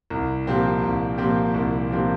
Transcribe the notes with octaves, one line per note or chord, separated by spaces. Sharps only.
C2
A#2 F3 C4 G4
C2
A#2 F3 C4 G4
C2
A#2 F3 C4 G4